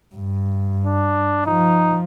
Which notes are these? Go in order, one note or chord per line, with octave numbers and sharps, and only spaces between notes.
G2
D4
F3 D#4